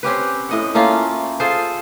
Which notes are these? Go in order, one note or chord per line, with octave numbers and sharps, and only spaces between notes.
C4 C#4 G4 B4
A2 D#5 F#5
A3 A#3 C#4 F4
F4 G#4 A4 C5